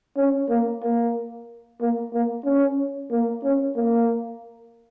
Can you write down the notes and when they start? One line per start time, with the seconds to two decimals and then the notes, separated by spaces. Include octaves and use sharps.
0.17 C#4
0.50 A#3
0.83 A#3
1.81 A#3
2.14 A#3
2.45 C#4
3.11 A#3
3.43 C#4
3.76 A#3